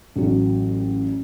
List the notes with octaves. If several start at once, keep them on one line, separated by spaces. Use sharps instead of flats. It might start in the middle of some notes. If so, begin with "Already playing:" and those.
A1 F#3